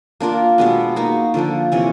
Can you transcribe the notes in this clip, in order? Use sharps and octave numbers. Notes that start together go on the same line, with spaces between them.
A#3 D4 F4 A#4
B2 G#3 B3 D4
A#3 D#4 F#4
D3 F3 A#3 D4
C3 E3 A3 C#4